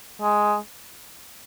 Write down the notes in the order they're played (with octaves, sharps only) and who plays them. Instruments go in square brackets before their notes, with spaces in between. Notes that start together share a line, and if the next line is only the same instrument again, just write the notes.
[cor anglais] G#3